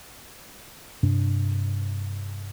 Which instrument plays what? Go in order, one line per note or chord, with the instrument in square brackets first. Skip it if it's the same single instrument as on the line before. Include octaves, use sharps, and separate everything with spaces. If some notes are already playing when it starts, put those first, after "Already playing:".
[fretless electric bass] G2 C3 D4